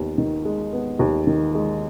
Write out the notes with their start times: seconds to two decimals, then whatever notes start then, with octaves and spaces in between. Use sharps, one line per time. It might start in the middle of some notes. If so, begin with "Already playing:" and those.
Already playing: D#2 B3
0.18 D#3
0.45 G#3
0.73 B3
0.99 D#2
1.27 D#3
1.55 G#3